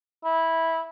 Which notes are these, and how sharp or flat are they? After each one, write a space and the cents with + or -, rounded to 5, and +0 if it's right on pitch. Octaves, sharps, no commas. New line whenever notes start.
E4 -10